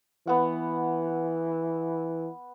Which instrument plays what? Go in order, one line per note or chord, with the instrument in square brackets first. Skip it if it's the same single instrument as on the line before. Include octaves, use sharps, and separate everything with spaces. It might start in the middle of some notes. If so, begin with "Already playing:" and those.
[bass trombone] E3 [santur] B3 F#5